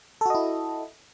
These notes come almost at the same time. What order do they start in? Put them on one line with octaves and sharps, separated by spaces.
A4 F#4 D#5 E4